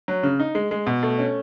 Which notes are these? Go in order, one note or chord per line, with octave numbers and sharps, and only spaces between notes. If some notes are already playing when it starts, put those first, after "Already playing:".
F#3
C#3
D#4
G#3
G#3
B2
A3
C#4